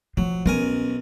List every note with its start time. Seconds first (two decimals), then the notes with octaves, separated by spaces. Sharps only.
0.17 F3 F#3
0.46 B1 C#4 A#4 G#5